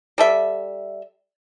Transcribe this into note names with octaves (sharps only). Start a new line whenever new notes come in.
G3 A4 E5